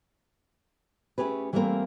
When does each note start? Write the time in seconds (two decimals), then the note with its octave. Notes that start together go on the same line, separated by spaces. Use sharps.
1.18 A3 C#4 G4 G#4 B4
1.53 E3 G3 A3 A#3 C4 A#4